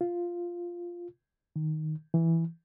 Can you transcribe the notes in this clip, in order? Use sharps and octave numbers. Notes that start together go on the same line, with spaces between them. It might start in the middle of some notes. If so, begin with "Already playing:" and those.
F4
D#3
E3